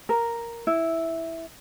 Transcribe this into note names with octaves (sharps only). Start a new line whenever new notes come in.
A#4
E4